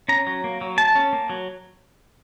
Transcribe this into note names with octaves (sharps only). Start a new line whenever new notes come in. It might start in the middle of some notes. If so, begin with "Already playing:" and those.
C#4 A#5
F#3
A#3
F#3
A#3 A5
C#4
A#3
F#3